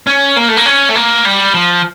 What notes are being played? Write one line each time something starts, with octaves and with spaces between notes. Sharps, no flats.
C#4
A#3
A3
A#3
C#4
A3
A#3
G3
F3